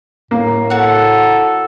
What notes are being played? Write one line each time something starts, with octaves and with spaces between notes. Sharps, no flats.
A2 A#3
F#4 A4 F#5